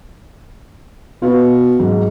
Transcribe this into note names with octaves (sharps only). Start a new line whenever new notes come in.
B2 F4 B4
G#2 F#3